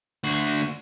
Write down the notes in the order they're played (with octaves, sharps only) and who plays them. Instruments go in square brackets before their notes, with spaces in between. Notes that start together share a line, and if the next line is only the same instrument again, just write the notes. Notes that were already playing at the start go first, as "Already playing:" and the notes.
[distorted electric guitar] D2 F#4